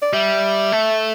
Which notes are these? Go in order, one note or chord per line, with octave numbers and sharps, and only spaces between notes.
D5
G3 E5
A3